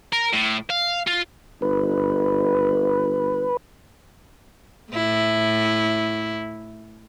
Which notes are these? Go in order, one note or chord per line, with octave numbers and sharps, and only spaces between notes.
A#4
A2
F5
F4
G1 B4
A2 E4